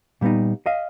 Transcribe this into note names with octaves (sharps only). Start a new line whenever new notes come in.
A#2 G3 B3 D#4
D#5 F5